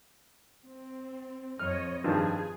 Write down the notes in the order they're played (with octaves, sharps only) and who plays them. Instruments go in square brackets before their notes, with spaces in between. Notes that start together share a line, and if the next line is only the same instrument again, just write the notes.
[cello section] C4
[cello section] F2 C#5 D#5 [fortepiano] F6
[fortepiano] G2 D#3 F3 [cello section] G#4